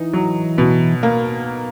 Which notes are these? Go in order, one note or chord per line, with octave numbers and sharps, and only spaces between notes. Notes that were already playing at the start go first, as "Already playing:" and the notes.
Already playing: E3 D#4
F#3
B2
A#3